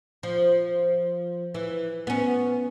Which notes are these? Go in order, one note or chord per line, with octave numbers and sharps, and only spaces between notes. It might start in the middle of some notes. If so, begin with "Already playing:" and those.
F3
E3
B3 C#4